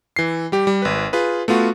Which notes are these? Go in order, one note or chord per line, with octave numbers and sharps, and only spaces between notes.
E3 C7
G3 G4
G3
G#1 B4
F4 G#4 B4
A3 B3 F4 F#4